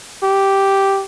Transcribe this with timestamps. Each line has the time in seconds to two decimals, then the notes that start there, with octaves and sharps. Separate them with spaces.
0.23 G4